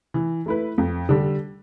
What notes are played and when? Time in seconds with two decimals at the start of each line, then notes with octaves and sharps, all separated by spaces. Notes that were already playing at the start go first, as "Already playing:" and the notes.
0.14 E3
0.46 A3 E4 B4
0.78 F2
1.09 D3 G3 D4 G4